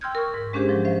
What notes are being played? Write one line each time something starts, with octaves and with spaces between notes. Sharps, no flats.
G5 C6 E6 F6 G6 G#6
A#4 C#6
G#2
G#3 C#4 D4 G4 G#4 C5
G#2 F3 F#3
C5 E5 F5